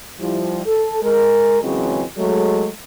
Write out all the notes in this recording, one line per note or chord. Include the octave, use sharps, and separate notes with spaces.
F3 G3 E4
A4
G#3 A#4
A#2 C#3 E3 F#3 G#3 C4
F#3 G#3 A3